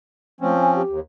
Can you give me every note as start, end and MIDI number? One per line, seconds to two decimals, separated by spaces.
0.41 0.82 53
0.41 0.53 57
0.41 0.82 60
0.41 0.82 61
0.61 0.73 80
0.75 0.99 67
0.89 1.00 39